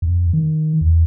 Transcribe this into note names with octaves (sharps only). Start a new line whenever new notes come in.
F2
D#3
E2